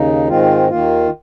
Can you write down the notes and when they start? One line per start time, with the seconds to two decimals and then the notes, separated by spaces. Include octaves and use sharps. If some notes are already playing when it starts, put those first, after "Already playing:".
Already playing: D#2 C#3 D#4
0.28 G#2 D#3 G#3 C4 F4
0.69 D#2 D#3 A#3 F4